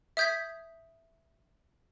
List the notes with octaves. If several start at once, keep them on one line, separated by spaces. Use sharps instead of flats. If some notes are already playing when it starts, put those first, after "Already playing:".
E5 D#6 G6 G#6 B6